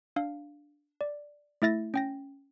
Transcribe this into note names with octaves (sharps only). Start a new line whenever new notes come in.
D4 F5
D5
A3 E4 E5 A6 A#6
C#4 G5 A#6